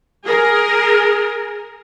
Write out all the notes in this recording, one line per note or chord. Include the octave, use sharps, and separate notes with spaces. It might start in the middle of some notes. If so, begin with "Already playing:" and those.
G#4 A#4